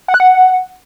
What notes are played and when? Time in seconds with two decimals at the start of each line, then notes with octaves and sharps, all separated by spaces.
0.08 F#5
0.14 F#6
0.20 F#5